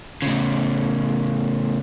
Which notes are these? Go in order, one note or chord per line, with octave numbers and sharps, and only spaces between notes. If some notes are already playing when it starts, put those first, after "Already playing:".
A2 C#3